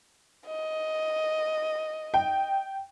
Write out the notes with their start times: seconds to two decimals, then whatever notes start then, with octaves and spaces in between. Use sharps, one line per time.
0.46 D#5
2.14 G5